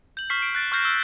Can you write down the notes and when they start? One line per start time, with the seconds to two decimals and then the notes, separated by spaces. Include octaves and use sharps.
0.17 G6 F#7
0.30 C#6 F6 B6 C7
0.42 D7
0.55 F#6 A6 D7
0.72 C#6 F6 G6 A#6 C7
0.85 E6